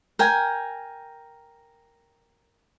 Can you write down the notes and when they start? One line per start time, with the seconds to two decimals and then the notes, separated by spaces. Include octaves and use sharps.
0.19 A#4 G5 G#5